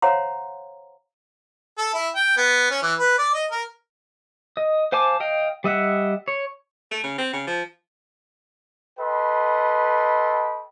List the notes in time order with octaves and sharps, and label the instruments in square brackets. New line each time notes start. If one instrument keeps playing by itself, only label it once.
[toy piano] C5 C#5 F5 F#5 A#5 C6
[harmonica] A4
E4
G5
B3
C#4
E3
B4
D5
D#5
A#4
[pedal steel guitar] D#5
C5 F5 G#5 A5 D6
D#5 F5 G5
G3 D#5 E5 F#5
C#5
[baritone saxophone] A3
C#3
C4
C#3
F3
[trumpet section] A4 B4 D#5 G5 B5 C6